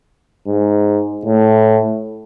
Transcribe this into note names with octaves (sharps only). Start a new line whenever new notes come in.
G#2
A2